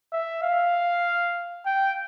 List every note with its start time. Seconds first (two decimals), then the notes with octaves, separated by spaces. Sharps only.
0.13 E5
0.43 F5
1.66 G5